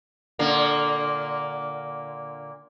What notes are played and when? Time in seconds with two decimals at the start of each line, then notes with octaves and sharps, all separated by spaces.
0.39 A#2 D3 A#3